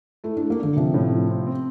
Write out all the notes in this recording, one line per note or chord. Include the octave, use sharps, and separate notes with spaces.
A3 E4
A3 D4
A#3
D3 D4
C3 F3
A2
F3
C4
C4